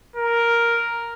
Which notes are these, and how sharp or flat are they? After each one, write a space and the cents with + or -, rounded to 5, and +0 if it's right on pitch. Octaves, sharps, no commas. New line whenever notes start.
A#4 +5